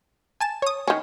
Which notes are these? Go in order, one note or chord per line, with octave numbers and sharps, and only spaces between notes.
G#5 A5 E7
C#5 D#6
D#3 C#4